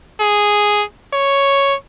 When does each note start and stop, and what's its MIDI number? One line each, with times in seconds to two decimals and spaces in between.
0.21 0.83 68
1.14 1.75 73